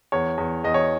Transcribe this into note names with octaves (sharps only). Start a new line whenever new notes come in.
E2 C#5
E2
E2 D#5
C#5